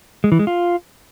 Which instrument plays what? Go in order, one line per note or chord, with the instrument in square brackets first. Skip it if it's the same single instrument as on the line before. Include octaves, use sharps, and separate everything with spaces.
[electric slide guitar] G#3
E3
G#3
F4